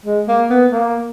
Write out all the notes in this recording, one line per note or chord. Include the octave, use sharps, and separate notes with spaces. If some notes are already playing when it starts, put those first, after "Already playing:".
G#3
A#3
B3
A#3